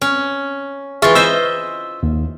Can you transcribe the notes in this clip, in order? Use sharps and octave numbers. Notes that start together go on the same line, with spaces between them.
C#4
E3 F4 G#4 E5 C#6
C5 D#5 E5 E6
D#2